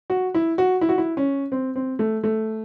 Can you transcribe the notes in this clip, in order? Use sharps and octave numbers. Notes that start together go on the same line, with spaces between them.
F#4
E4
F#4
E4
F#4
E4
C#4
C4
C4
A3
A3